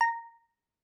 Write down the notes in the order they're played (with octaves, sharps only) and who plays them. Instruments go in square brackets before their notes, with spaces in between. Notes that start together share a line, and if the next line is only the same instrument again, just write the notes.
[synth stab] A#5